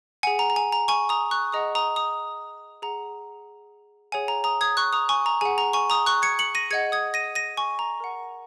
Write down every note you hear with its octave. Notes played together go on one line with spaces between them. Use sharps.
G#4 F#5 G#5
A#5
A#5
G#5
A#5
G#5 C#6
A#5 D#6
C#6 F#6
G#4 D#5 F#5 A#5 D#6
A#5 D#6
A#5 D#6
G#4 F#5 A#5
G#4 C#5 F#5 G#5
A#5
A#5 D#6
D#6 G#6
C#6 F#6
A#5 D#6
G#5 C#6
A#5
G#4 F#5 G#5
A#5
G#5 C#6
A#5 D#6
C#6 F#6
G#6 C#7
C#7 F#7
A#6 D#7
G#4 D#5 F#5 G#6 C#7
D#6 G#6
A#6 D#7
A#6 D#7
G#5 C#6
A#5
A#4 F#5